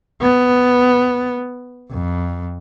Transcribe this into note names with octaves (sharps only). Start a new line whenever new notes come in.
B3
F2